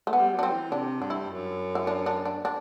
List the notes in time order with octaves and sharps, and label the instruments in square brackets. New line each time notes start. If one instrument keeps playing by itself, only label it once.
[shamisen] A3
[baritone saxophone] G3 [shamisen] B3
[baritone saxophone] F#3
[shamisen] D4
C4
[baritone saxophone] E3
[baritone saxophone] C3 [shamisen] D4
[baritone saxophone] G2 [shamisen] D4
[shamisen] E4
[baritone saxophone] F#2
[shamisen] E4
D4
D4
D4
D4